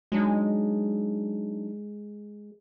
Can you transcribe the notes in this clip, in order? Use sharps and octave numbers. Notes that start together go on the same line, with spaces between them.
F#3 G#3 D4 D#4